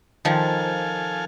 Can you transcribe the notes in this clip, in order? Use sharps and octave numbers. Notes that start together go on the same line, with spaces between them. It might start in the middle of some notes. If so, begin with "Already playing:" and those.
D#3 F3 A4 F5 G#5